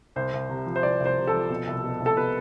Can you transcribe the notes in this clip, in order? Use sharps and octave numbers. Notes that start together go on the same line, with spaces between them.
C2 C5
C2
C3
F3
C5
C2 D5
C2
C5
C3
A4
F3
B2
C2
B2
C2
A4
B2 B4